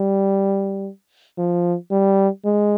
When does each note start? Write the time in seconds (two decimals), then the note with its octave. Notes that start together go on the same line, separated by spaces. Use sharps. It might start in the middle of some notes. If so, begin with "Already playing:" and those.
Already playing: G3
1.38 F3
1.91 G3
2.45 G#3